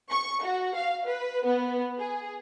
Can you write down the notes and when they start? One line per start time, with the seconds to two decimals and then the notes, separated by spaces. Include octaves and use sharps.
0.11 C#6
0.44 F#4
0.76 F5
1.07 B4
1.46 B3
1.99 G#4